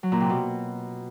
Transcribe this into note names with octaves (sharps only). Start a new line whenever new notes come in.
F#3
A#2
C3
B2